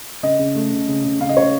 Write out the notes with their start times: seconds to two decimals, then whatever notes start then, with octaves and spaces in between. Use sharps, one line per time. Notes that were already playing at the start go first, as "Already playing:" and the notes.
0.23 C#3 D#5
0.39 C#3
0.55 A3
0.72 C#3
0.88 C#3
1.04 C#3
1.20 C#3 F5
1.29 D#5
1.37 C#3 C#5